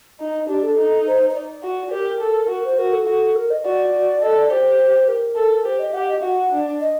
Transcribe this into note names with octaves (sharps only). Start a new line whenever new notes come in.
D#4 D#5
D4 G4
A4
D#4
C5
C5
D5
F#4
G4 A#4
A4
F#4 A#4
C5
F#4 A#4
A4
F#4
A#4
D#5
F#4 D5
F#4
A4 D#5
D5
G4 C5
A#4
A4
G4 C5
D#5
G4 F#5
D#5
F#4 F#5
D4
D#5